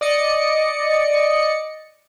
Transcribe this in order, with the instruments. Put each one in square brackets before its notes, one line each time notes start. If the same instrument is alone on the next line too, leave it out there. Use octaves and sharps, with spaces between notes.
[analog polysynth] D5 D#5 C#7